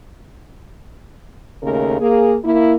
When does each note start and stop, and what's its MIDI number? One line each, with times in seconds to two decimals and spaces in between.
1.62 1.96 39
1.62 1.96 49
1.62 1.96 57
1.62 1.96 70
1.99 2.36 58
1.99 2.36 68
2.45 2.74 58
2.45 2.74 64